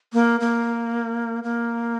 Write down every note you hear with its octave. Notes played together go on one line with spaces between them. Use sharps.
A#3
A#3
A#3